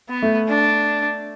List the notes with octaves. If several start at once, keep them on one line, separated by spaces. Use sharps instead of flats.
B3
A3
D4